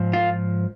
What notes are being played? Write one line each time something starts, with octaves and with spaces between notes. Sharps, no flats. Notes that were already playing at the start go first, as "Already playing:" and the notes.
Already playing: G#2 F3
F4